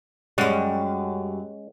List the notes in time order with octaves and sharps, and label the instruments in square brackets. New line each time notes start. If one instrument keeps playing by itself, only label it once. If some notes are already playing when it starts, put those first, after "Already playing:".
[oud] F#2 G3 [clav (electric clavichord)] G#3 C#4 F#5